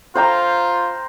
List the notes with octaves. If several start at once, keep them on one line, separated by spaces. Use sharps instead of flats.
F4 C5 G5 A#5